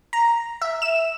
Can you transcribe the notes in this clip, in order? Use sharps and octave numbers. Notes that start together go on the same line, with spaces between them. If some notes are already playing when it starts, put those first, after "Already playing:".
A#5
E5
E7